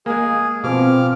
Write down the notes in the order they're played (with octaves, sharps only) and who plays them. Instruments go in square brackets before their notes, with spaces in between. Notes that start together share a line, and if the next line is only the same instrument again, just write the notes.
[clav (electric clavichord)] G#3 A#3 [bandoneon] G#4
[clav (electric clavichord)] B2 [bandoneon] F3 D6 F6 [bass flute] C4